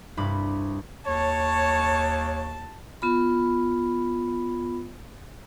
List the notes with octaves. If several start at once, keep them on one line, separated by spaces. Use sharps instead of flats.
C2 G2 B5 D6
D#2 C#5 A5
B3 F4 B5